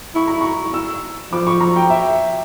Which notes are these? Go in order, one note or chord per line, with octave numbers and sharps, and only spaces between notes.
E4 C#6
A#5
C#6
E6
F3 D6
C#6
A#5
G5
E5